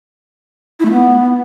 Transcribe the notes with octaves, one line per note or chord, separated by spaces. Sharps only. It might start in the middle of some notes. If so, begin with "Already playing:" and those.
E4
A3
B3